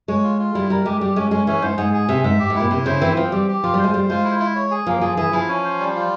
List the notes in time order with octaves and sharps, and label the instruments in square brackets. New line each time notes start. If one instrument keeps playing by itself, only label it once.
[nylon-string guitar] G#3 [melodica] C#5
[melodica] F4
F4
[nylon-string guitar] G3 [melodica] E4
[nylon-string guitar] G3 [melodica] A#4
[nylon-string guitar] G#3 [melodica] G4
[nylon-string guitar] G3 [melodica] G4
[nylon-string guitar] G#3 [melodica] C#4
[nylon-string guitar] G#3 [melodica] C#4
[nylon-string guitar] E3 [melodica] C#4
[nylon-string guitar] G#2 [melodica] C5
[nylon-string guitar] G#2 [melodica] G#4
[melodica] G#4
[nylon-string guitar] C3 [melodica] E5
[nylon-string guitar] G#2 [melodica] E5
[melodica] G4
[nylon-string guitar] G#2
[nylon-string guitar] A#2 [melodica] E4
[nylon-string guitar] C3 [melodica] E4
[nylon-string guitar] C#3 [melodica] C5
[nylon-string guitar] E3 [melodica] C4
[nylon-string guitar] F3 [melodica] C4
[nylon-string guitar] G3 [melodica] G4
[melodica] G4
[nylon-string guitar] F3 [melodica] F4
[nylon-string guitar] G3
[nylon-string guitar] G#3 [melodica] C5
[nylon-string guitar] G3 [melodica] C5
[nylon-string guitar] G#3 [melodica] F4
[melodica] E4
E4
C#5
G#4
[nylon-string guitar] F3 [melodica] A#3
[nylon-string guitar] F3 [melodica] G#4
[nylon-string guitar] E3 [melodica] G#4
[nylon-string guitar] F3 [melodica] E4
[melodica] C#4
C5
G3
F4